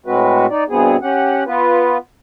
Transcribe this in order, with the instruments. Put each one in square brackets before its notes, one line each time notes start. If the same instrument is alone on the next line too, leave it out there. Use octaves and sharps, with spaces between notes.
[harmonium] A2 G#3 C4 F#4 B4
D#4 D5
G2 B2 B3 C4 G#4
C#4 G4 F#5
B3 F4 B4